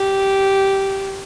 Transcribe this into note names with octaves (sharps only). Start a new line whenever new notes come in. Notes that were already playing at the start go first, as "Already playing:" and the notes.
Already playing: G4